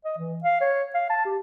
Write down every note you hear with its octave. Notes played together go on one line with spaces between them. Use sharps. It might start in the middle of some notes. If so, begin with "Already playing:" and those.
D#5
E3
F5
C#5
F5
A5
G4